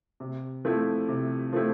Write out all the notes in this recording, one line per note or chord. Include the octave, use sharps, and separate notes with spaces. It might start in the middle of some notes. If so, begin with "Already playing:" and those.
C3
F3 A3 C4 E4
C3
F3 A3 C4 E4